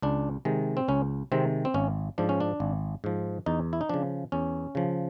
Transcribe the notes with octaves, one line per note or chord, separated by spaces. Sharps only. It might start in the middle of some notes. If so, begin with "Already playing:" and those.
C#2 D4
C3 D#3 G#3
C4
C#2 C#4
C3 D#3 G#3 C4
C4
G#1 C#4
G#2 F3 D4
C#4
D4
G#1
G#2 F3
E2 D#4
E4
D#4
C#3 F3 D4
E2 C#4
C#3 F3